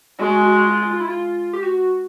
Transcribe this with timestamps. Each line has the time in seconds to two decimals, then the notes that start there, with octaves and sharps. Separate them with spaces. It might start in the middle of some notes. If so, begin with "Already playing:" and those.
0.19 G#3 F#4
0.43 F#4
0.67 F4
0.91 F4
1.00 E4
1.08 F4
1.53 G4
1.63 F#4